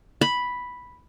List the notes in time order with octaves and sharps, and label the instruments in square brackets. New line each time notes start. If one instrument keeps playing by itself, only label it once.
[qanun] B5